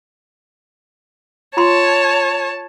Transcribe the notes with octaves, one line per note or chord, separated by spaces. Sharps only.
F4 C#5 A5 C6